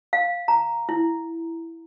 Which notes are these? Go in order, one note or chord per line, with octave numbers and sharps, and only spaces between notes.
F5
A#5
E4